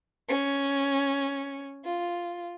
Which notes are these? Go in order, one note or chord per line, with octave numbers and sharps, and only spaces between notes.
C#4
F4